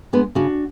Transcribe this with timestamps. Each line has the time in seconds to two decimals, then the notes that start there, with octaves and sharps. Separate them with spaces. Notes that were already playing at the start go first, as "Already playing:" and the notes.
0.13 G#3 B3 D4
0.35 C#3 D4 F#4